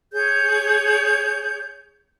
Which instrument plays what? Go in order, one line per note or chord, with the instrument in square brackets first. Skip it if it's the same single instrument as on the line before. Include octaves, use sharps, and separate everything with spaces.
[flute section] G#4 C#5 G6